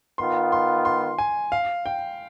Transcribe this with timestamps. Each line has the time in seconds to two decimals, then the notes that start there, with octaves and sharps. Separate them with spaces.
0.18 D#3 B3 F4 C6
0.52 C6
0.85 C6
1.18 G#5
1.52 F5
1.86 G5